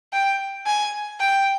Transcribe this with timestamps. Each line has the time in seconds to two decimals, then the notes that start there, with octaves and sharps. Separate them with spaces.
0.13 G5
0.66 G#5
1.20 G5